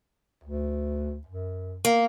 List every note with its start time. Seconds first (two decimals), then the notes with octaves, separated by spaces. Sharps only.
0.44 D2
1.27 F#2
1.85 A#3